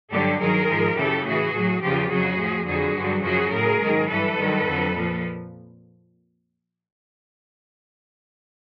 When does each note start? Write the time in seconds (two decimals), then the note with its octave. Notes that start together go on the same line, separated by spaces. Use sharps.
0.11 G2 D3 F#3 G4 A4
0.40 G2 D#3 F#3 G#4 A#4
0.68 G#2 F3
0.97 F#2 C#3 E3 G4 A4
1.25 A2 E3 F#4 G#4
1.54 A2 F#3
1.82 E2 C#3 F3 F4 G4
2.10 F2 C#3 F#3 F#4 G#4
2.39 A2 F3
2.67 F2 D3 F#3 F#4 G#4
2.96 G2 D3 F#3
3.24 F#2 C#3 F3 F#4 G#4
3.53 A2 F#3 G#4 A#4
3.82 G#2 D#3 F#3
4.10 G2 E3 A4 B4
4.39 G2 D#3 F#3
4.67 F2 D3 F#3
4.95 A#2 F3